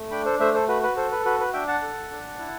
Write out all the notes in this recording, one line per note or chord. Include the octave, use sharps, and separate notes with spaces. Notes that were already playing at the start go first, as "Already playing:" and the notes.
Already playing: A3
D4 G5 B5
A4 C5
A3 C5 E5
A4 C5
F#4 B4
B4
A4 C5
B4
F#4 B4
B4
D4 E5 G5
F#5 A5
A4
D4
E4